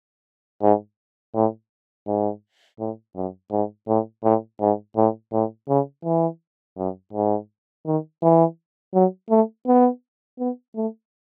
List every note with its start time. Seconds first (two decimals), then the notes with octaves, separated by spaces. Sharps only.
0.62 G#2
1.35 A2
2.07 G#2
2.80 A2
3.16 F#2
3.52 G#2
3.88 A2
4.24 A2
4.61 G#2
4.97 A2
5.33 A2
5.69 C#3
6.05 E3
6.77 F#2
7.13 G#2
7.86 D#3
8.22 E3
8.94 F#3
9.30 A3
9.67 B3
10.39 B3
10.76 A3